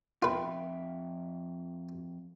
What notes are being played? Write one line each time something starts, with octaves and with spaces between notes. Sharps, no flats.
F2 F4 B4 E5 G5